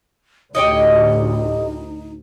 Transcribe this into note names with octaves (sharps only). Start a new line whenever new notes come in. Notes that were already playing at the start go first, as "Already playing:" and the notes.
D2 A2 D#4 G4 C#5 D#5